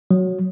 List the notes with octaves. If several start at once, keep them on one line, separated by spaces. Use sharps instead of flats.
F#3